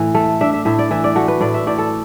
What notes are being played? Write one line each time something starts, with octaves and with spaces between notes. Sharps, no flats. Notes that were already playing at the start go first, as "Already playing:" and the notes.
Already playing: A2 E3
A3
D4 E5
E5
A2 E5
D5
E3 E5
D5
A3 F#4
B4
A2 D5
E5
A2 D5
A4